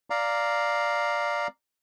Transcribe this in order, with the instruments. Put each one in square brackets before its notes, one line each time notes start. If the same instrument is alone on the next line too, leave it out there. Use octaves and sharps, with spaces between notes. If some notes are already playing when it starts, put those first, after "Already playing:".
[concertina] D5 F5 A#5